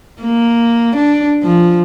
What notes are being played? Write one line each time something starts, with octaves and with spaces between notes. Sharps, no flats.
A#3
D4
F3